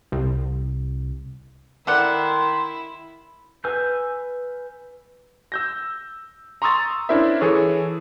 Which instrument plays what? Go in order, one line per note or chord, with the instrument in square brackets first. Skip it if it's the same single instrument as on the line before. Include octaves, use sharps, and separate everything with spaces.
[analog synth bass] C2
[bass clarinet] D#3 [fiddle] E4 [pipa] A4 D5 F#5 [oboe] C6
[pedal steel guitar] B4 G#5 E6 F6 G6
[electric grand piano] E6 G6 A#6
A#5 C6 C#6 D#6 E6 A6
C#4 D4 E4 A#4 C5 E5
E3 G#4 A4 C#5